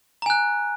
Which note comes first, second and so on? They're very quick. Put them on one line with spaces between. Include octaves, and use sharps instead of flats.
A#5 G#5 F#6